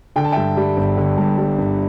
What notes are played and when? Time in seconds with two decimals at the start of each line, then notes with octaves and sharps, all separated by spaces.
0.16 D3 G5
0.24 A5
0.32 G2 E5 G5
0.57 G3
0.77 G1
0.97 D3
1.18 G2
1.38 G3
1.58 G1